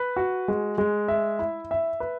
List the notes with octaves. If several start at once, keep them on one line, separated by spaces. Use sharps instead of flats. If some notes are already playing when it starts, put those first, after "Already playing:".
Already playing: B4
F#4
G#3
G#3
E5
E4
E5
B4